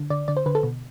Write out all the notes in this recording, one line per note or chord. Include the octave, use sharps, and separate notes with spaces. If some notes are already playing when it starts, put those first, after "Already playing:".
Already playing: D3
D3 D5
D3 D5
C5
D3 B4
A4
B2